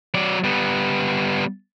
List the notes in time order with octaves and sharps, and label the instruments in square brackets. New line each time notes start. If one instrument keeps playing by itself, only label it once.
[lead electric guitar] F#3 D5
G3 B3